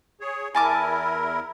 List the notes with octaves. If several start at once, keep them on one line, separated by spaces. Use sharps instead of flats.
G#4 C#5
E2 E4 A#4 G#5 A5 D6